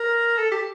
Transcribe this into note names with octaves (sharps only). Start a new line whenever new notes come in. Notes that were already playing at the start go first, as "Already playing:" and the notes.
Already playing: A#4
A4
G4